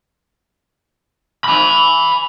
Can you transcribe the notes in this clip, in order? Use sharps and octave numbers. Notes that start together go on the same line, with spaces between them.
G#5 B5